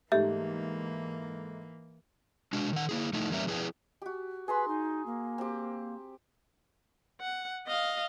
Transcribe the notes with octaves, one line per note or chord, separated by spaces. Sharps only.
G#2 E3 A3 A#3 G4 E5
G#3 D4 F#4
D#3 F#5
A#3 E4 G#4
F3 A3 D#4 E4
E2 G3 A#3 C#4 E5 A#5
F3 E4 G#4 B4 G5
F#4 G4
G#4 B4 A#5 C6
D#4
A#3
C4 G4
F#5
D#5 F5